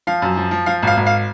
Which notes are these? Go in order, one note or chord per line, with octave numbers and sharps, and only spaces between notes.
F3 F5
F#2
F3
F3
F3 F5
G#1 F5
G#1
F5